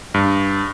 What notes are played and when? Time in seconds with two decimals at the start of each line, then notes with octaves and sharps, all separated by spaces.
0.14 G2